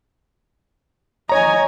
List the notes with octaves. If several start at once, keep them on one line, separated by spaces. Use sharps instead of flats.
C#5 D#5 G#5 A#5